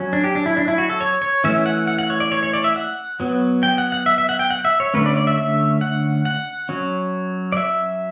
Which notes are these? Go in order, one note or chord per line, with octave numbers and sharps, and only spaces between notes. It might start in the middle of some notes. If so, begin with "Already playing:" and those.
Already playing: F#3 C#4
D4
G4
D4
E4
D4
E4
F#4
A4
C#5
C#5
E3 A3 C#4 E5
F#5
F#5
F#5
C#5
D5
C#5
C#5
D5
E5
F#5
F#3 B3
G5
F#5
F#5
E5
E5
F#5
G5
F#5
E5
C#5
D3 A3 C#4 B4
D5
D5
E5
E5
F#5
F#5
F#3 C#4
D5
E5